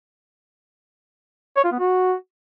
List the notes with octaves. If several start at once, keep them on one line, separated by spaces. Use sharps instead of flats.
C#5
F4
B3
F#4